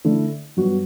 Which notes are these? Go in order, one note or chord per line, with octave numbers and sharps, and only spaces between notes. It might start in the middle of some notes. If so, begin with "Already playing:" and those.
D3 A3 E4
G2 F#3 B3 F#4